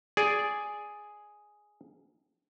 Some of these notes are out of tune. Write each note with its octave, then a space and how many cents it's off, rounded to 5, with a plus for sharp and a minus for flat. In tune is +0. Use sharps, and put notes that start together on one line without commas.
G#4 +0 D5 -5